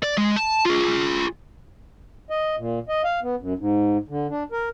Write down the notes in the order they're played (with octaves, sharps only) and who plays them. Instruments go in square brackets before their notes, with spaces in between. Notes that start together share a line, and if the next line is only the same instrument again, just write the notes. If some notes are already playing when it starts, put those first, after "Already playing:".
[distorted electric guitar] D5
G#3
A5
F4 G#4
[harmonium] D#5
A#2
D#5
F5
B3
F#2
G#2
D3
D4
A#4